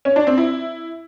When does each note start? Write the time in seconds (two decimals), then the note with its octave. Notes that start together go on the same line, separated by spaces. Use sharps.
0.05 C#4
0.16 D4
0.27 C4
0.38 E4